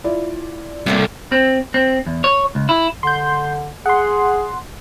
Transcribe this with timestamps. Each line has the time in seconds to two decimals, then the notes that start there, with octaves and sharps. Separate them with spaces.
0.04 E4 F4 D5
0.86 C2 A2 C3 A3 A#3
1.32 C4
1.74 C4
2.07 E2
2.24 C#5
2.55 C#2
2.69 E4
3.03 D3 C6 G6
3.86 G#4 F#5 C6